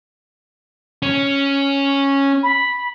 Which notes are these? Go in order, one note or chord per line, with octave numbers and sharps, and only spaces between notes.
C#4
B5